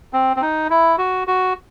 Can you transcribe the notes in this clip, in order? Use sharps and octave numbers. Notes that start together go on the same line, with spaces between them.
C4
C4
D#4
E4
F#4
F#4